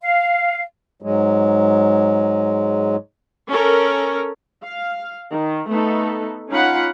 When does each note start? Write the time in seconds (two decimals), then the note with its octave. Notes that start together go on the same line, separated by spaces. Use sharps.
0.01 F5
1.02 G#2 F#3 G#3
3.49 C#4 A4 A#4
4.63 F5
5.31 D#3
5.70 A3 B3 D#4 A4
6.50 C#4 D#4 F4 F5 F#5 B5